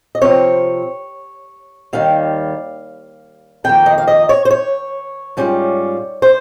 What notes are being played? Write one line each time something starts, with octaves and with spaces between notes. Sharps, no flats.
D#5
C3 F3 C4 C#5
D#2 D#3 G3 F5
F2 D#3 A#3 G5
D#5
F5
D#5
C#5
C5
C#5
G#2 G3 C#4 F4
C5